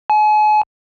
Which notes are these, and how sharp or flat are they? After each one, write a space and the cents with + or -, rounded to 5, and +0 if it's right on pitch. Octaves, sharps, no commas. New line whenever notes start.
G#5 +40